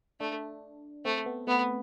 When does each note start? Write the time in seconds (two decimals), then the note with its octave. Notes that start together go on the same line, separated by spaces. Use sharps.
0.20 A3 D4
1.05 A3 C4
1.26 B3
1.47 A3 B3